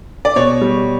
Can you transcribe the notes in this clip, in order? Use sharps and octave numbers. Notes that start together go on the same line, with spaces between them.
D5
B2 C#5
G3